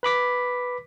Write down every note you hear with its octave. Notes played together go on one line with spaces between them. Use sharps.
B4 B5 D6 B6